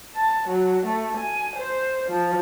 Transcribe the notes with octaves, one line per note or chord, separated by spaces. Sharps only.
A5
F#3
A3
G#5
C5
F3